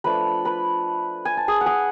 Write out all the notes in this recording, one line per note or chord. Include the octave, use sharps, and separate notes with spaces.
F3 A3 D4 B4 B5
B4 B5
G#5
A5
G#4 G#5
F#5
G#4 G#5